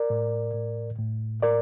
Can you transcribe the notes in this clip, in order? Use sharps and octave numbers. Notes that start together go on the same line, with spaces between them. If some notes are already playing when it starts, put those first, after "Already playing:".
Already playing: A#4 D5
A2
A2
A2
A2 A#4 D5